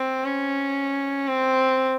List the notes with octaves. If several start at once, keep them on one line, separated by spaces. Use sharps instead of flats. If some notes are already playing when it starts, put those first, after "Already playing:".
Already playing: C4
C#4
C4